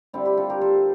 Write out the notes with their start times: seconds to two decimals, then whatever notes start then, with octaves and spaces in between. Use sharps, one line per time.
0.13 D3 G3 C4 E4
0.25 E4 G4
0.37 F4 A4
0.50 G4 A#4
0.61 A4 C5